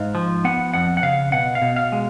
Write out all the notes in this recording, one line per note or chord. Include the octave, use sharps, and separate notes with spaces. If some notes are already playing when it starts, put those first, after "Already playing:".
Already playing: G#2 F5
F3
B3 F#5
F2 F#5
F#5
C#3 F5
B2 F#5
F5
B2
F5
G#3